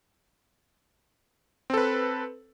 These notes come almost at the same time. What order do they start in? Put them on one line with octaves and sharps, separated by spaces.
C4 A4 B4